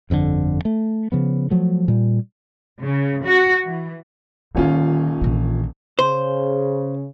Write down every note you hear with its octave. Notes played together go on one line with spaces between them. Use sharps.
G1 F2 A#2 D3
A3
C#3 F3 B3
F3 F#3 A3
A#2 G3
C#3
F#4
E3
D#1 D3 D#3 C#4 F4
A#1 E3
C#3 C5